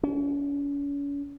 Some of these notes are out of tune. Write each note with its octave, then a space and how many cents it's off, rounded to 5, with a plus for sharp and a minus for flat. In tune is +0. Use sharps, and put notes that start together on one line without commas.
C#4 +40